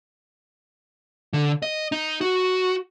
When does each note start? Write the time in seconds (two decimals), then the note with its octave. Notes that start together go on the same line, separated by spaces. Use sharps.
1.33 D3
1.62 D#5
1.92 D#4
2.21 F#4